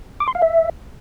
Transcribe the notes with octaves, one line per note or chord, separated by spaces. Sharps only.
D6
C6
F5
E5